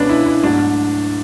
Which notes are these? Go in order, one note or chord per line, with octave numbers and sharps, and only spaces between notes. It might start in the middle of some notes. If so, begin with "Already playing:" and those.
Already playing: C#2 B2 G#3 C#4 D4 B4
E4
E4
G#2 F#3 A3 D4